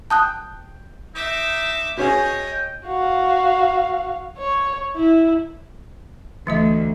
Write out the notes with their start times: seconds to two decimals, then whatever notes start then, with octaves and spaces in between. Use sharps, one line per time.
0.10 G5 A5 D#6 F#6
1.15 D#4 E5 D6
1.97 B2 C#4 G#4 C#5 D#5 G5
2.86 F#4 F5
4.38 C#5
4.96 E4
6.47 D2 E3 A3 D#5